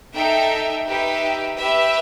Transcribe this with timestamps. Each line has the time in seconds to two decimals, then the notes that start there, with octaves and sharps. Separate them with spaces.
0.15 D#4 A4 E5 G5
0.86 D#4 G4 B4 E5 G5
1.58 G4 B4 E5